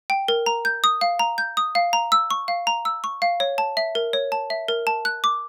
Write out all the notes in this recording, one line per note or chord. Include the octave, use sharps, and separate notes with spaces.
G5
A#4
A#5
G6
D#6
F5
A#5
G6
D#6
F5
A#5
E6
C#6
F5
A#5
E6
C#6
F5
C#5
A5
E5
A#4
C#5
A5
E5
A#4
A5
F#6
D6